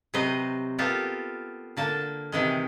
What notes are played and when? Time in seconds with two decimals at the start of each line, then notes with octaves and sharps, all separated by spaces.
0.14 C3 F#3 B4 C5 D#5
0.78 A#3 B3 F4 G4 A4
1.77 D3 A#3 A5
2.32 C3 D#3 E3 G#3